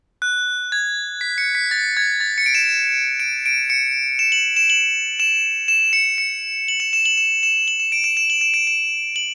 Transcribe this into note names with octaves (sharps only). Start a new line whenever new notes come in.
F#6
G#6
B6
C#7
B6
A6
G#6
A6
C#7
D7
E7
D7
D7
C#7
E7
F#7
E7
F#7
E7
E7
C#7
C#7
F#7
E7
E7
F#7
E7
E7
F#7
E7
D7
E7
E7
F#7
E7
D7
E7
F#7